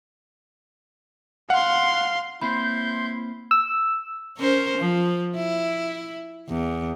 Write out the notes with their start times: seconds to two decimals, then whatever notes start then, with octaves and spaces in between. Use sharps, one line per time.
1.50 F5 F#5 C6
2.41 A#3 C4 E4 C5 B5 C6 G6
3.51 E6
4.37 C#4 A#4 C5
4.77 F3
5.35 E4
6.49 E2